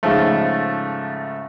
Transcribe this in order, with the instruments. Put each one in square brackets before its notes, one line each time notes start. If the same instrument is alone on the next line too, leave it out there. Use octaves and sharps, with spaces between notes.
[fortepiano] G#2 C#3 F3 A3